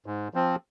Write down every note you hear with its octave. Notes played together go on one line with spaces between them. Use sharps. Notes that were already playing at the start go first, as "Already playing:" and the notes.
G#2
F3 C4